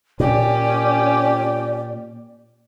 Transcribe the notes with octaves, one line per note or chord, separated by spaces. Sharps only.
A#2 C#4 G4 D5